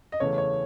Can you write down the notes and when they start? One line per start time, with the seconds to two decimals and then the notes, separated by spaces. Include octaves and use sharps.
0.12 D#5
0.20 E2 C#3 E3 A3 C#4 C#5
0.38 C#5